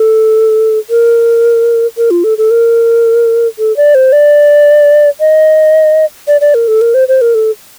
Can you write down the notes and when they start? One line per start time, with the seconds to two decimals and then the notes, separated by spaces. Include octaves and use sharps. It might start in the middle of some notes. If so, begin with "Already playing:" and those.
Already playing: A4
0.90 A#4
1.98 A#4
2.11 F4
2.24 A4
2.38 A4
2.51 A#4
3.59 A4
3.77 D5
3.95 C5
4.12 D5
5.20 D#5
6.27 D5
6.41 D5
6.54 A#4
6.68 A4
6.81 A#4
6.94 C5
7.08 C5
7.21 A#4
7.35 A4